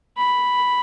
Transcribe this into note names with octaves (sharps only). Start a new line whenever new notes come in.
B5